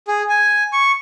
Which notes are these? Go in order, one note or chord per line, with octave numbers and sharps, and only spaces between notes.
G#4
G#5
C#6